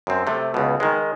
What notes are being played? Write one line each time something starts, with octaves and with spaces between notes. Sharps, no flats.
F#2 C4
C3 A3
C#2 B2
D#3 G#3